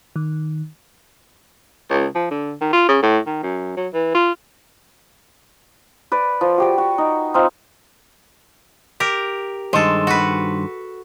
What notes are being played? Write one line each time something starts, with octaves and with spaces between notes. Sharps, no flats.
D#3
C#2
F3
D3
D#3
F4
C#3
A2
D#3
F#2
F#3
E3
F4
B4 D5
F3
F#4 G4 D5
F#4
D#4
C4 D#4 F4
G4 A#4
G2 D#3 G#3 A4 C5
F#4 B4